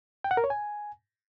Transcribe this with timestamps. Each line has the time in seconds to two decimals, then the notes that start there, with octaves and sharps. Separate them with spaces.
0.24 G5
0.31 F#5
0.37 A#4
0.44 C#5
0.50 G#5